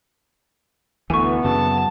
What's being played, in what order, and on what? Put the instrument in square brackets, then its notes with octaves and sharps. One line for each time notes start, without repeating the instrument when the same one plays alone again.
[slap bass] D2 E3 [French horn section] D3 A3 B3 [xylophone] G#5 C#6
[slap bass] F#2 C#3 F#3 [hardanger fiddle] A5